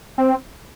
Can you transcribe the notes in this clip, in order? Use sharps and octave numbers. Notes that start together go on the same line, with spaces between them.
C4